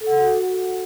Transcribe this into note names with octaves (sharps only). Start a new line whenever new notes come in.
A4
F#5
A4
F#4